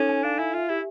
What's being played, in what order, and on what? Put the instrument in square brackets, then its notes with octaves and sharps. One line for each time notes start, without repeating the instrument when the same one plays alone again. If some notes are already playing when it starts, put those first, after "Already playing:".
Already playing: [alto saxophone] C#4 [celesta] D#4 A4
[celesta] G#5
[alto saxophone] D4 [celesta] F5
[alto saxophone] E4 [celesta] G#5
[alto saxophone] F4 [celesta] E5
[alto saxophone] E4 [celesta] G4